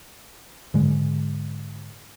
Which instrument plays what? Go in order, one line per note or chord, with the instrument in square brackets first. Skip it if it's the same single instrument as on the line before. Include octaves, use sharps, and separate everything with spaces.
[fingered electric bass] G#2 D3 G#3